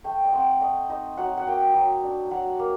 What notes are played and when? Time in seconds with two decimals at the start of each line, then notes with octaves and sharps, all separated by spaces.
0.04 A3 G5
0.25 D#5
0.33 C4 F#5
0.61 A3 D#5
0.89 D#4 D#5
1.17 F#3 F#5
1.37 F#5
1.47 A#3 G5
1.74 F#3
2.03 D4
2.31 F#3 F#5
2.59 A#3